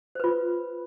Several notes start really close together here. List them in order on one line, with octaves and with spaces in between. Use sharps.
C5 B4 F4